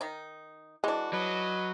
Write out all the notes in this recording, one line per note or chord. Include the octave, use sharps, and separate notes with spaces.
D#3 D#4
E3 G#3 D4 F#4
F#3 B4 D#5